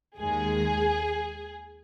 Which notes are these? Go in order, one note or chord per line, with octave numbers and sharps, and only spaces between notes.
D#2 D#3 G#3 G#4